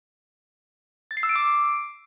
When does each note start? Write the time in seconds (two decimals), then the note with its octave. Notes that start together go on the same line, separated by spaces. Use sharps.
1.11 A6
1.17 C7
1.23 E6
1.29 D7
1.36 D6